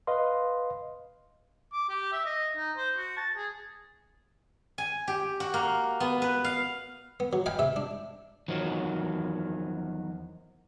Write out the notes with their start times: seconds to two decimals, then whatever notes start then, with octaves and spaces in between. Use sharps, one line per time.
0.07 B4 D#5 F5 C6
1.73 D6
1.89 G4
2.13 E5
2.26 D#5
2.57 D#4
2.77 C5
2.97 F#4
3.17 A5
3.37 G#4
4.78 G#5
5.07 G4
5.40 F#4
5.54 A#3
6.00 B3
6.22 B4
6.44 F5
7.20 B3
7.33 F#3
7.46 D#5 F5 G5 G#5 B5
7.59 C3 E5
7.76 D4
8.48 E2 D#3 F3 F#3